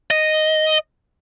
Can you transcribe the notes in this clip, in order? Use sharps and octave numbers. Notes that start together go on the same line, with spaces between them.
D#5